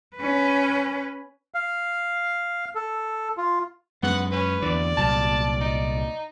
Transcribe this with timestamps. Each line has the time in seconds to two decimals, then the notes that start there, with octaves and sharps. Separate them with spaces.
0.17 C#4 B4
1.54 F5
2.75 A4
3.37 F4
4.03 F#2 G#3 B3 F#5
4.32 C#4 B4
4.62 E2 D3 D5
4.97 C2 A#2 F#3 A5
5.61 D#4